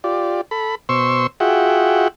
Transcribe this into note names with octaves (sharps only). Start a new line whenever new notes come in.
F4 G4 D5
A4 B5
B2 C5 C6 C#6 E6
F4 F#4 G#4 E5 F#5 G5